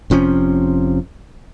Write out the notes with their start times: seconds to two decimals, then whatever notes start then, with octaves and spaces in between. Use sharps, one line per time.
0.10 F1 C3 F3 C#4